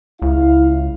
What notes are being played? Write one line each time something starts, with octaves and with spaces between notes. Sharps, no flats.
C#2 E4 F5